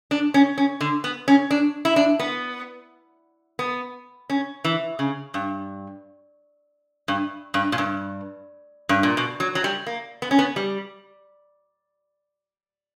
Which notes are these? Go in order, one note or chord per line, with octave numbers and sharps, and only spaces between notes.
D4
C#4
C#4
D3
B3
C#4
D4
E4
D4
B3
B3
C#4
E3
C#3
G2
G2
G2
A#2
G2
G2
A#2
B2
F#3
F#3
G3
A#3
B3
C#4
B3
G3